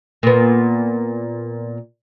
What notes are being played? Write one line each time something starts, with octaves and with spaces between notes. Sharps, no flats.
A#2 B3